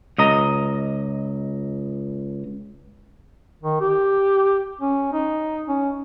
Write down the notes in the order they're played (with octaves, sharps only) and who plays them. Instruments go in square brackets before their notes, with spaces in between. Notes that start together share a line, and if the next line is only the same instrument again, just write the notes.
[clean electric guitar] C#2 D#5 A#5
[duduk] D#3
G4
C#4
D#4
C#4